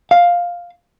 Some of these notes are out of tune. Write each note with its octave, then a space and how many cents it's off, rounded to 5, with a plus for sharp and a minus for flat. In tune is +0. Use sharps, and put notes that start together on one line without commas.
F5 +5